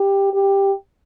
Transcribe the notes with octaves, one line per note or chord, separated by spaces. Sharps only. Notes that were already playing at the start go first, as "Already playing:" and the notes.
Already playing: G4
G4